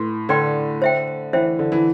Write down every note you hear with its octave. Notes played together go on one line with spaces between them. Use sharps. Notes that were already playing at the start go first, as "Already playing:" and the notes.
Already playing: A2 B4 C6
D3 B4 D5 G5 C6
C5 E5 G5
E3 C5 E5 G5
D3
E3